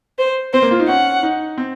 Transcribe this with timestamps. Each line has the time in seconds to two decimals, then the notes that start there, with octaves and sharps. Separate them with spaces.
0.19 C5
0.53 C4 C5
0.62 A#3
0.71 F4
0.80 D#4
0.88 C#4 F#5
1.23 D#4
1.58 C4